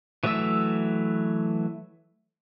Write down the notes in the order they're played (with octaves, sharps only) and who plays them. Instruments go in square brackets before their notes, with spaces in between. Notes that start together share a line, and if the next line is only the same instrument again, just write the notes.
[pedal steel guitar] E3 F#3 A3 E5 E6